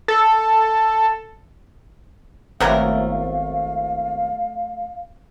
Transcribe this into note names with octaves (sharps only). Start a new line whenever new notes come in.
A4
G#1 C3 F#3 A3 B3 E4 A#4 F5